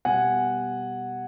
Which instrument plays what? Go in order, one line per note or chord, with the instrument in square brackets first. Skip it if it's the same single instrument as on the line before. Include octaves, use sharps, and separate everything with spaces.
[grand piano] B2 G3 F#5 G#5